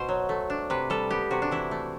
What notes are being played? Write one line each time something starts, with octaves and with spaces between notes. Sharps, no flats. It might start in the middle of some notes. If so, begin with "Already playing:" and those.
Already playing: B2 C5
F#3
A3
D4
C3 B4
G3 A4
B3 G4
C3 F#4
D4
E3 E4
A3